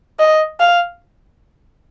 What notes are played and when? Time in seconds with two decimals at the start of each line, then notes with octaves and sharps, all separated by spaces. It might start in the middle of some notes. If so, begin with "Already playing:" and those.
0.20 D#5
0.60 F5